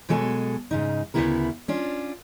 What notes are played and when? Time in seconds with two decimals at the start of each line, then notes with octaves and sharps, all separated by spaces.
0.09 B2 F#3 G#3 A4 G#5
0.71 G#2 C#3 D#4
1.14 D2 A#2 C#3 B3 E4 A#4
1.68 C#4 D4 F4